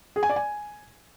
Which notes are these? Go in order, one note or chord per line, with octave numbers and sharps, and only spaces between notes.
G#4
G#5
D5
G#5